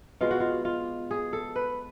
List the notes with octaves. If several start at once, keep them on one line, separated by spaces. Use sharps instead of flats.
B2 G#3 F4
F#4
F4
F4
G#4
A4
B4